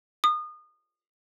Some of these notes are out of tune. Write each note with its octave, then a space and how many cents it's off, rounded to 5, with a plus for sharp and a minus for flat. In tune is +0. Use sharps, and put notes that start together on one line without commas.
D#6 -30